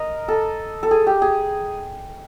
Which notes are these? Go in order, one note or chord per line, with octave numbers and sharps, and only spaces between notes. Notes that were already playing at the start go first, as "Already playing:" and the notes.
Already playing: A#4 D#5
A4
A4
G#4
G4
G#4